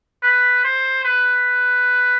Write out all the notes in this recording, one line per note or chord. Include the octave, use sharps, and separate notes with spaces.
B4
C5
B4